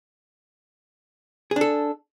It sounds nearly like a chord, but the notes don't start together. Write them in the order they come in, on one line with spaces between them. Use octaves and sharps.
G#4 D4 A4